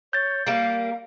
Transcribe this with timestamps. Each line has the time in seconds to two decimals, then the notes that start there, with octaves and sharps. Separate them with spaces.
0.13 C#5 G6 A6
0.46 G3 A#3 F5